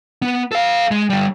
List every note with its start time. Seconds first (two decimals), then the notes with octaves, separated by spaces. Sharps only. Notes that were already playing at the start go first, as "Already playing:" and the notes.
0.22 B3
0.52 A4 F5
0.91 G#3
1.10 D3 G3